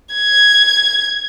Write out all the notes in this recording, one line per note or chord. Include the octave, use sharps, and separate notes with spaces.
G#6